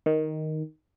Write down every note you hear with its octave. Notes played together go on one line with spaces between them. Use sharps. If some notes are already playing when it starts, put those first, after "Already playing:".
D#3